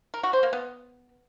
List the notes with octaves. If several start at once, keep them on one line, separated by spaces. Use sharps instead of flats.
A#4
F#4
C5
A#3
B3